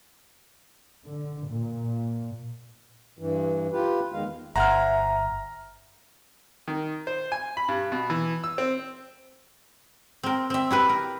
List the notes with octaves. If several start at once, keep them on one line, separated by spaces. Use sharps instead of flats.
D3
A#2
G2 E3
F4 G4 B4
E2 D#3 G#3 F5
G1 C5 E5 F#5 G#5 A#5 F6
D#3
C5
G#5
B5
G2
B2
E3
E6
C4
C4 A#4
C4 E5
E4 G4 B4
A#4